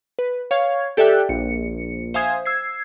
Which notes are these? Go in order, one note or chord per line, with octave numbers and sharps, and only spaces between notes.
B4
C#5 F5 C#6 G#6
G4 A4 D5 E5 G5 F#6
A#1 C#7
C5 E5 F5 G#5 D#6 G#6
E6 G#6 C7